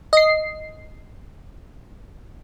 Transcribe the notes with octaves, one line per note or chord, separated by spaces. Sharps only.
D#5 C7